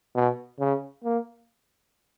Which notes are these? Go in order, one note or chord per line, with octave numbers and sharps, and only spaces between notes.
B2
C#3
A#3